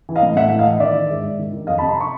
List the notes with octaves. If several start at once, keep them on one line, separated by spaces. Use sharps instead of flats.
E3
D#5 F5
A2
A2 E5 F#5
E3
D#5 F5
E3
D#3 D5 E5
D#3
G#2
G#2
D#3
D#3
F2 D#5 F5
A5 B5
C3
A#5 C6
B5 C#6